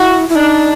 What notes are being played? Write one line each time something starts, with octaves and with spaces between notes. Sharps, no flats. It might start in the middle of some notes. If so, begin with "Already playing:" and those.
Already playing: E4 F#4
E4
D4 D#4